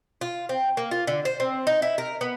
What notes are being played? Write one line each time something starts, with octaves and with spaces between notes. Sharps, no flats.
F4
C4
A#3
F4
D3
C5
C4
D#4
E4
A#4
B3